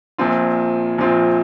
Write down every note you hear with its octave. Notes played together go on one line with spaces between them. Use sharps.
A#1 A#2 F3 C4 F4
A#1 A#2 F3 C4 F4